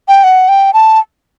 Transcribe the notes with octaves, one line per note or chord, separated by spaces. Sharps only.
G5
F#5
G5
A5